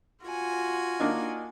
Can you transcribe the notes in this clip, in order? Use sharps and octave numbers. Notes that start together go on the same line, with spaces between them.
F4 F#4 G#5
A#3 D4 D#4